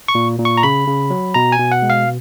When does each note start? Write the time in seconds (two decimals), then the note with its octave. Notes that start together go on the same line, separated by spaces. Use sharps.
0.08 C#6
0.15 A#2
0.39 A#2
0.45 C#6
0.57 A#5
0.63 C#3 B5
0.88 C#3
1.10 F#3
1.34 B2 A#5
1.52 G#5
1.59 B2
1.72 F#5
1.82 G#3
1.90 F5